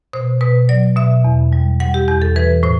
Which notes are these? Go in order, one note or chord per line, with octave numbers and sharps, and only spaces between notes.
B2 C5
B2 B4
F#3 D5
B2 E5
E2
G3
G3 F#5
G4
E2 G4
A4
E3 B4
A2 C5